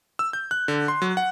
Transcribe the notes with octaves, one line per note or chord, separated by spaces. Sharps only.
E6
G6
F#6
D3
C6
F#3
F#5